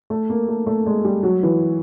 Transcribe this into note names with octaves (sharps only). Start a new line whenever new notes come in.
A3
A#3
A3
A3
G#3
G3
F#3
E3